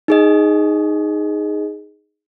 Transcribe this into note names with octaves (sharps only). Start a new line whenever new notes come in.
D#4 G#4 D#5